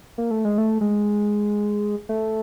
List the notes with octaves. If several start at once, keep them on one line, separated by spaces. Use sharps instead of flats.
A#3
A3
G#3
A3
G#3
A3